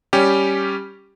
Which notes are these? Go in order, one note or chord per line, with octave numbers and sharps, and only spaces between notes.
G3 C#4 G4